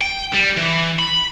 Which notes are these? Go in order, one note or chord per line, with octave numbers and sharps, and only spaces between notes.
G5
G3
E3
B5